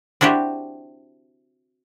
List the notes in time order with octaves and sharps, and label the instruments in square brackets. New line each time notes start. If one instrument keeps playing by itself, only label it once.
[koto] C4 D4 E4 F#4 G4